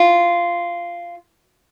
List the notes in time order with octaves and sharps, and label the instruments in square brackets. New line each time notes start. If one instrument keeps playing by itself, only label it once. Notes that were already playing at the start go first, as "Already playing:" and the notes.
Already playing: [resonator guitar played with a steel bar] F4